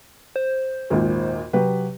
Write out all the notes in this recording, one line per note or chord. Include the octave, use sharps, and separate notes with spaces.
C5
G#1 D#2 A#2
C3 F#3 G4 B4